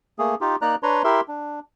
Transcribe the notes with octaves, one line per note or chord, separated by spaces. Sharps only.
A3 A#3 G#4
D#4 F4 G4
A#3 D#4 D5 A#5 F#6
D4 B4 C#5 A#5 C6
E4 G4 A#4 E5 C6
D4